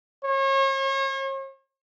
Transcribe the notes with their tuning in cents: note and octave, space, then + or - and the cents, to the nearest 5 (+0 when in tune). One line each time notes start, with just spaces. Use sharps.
C#5 -40